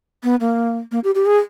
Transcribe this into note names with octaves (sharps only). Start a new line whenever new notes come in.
B3
A#3
A#3
G4
G4
G#4